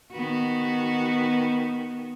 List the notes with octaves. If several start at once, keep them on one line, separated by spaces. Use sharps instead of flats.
D#3 B3 F#4